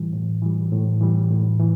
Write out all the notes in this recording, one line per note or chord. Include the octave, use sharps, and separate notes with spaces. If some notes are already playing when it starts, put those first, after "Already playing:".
Already playing: A2 E3 G3
A2
E3 G3
A2
E3 G3
A2
E3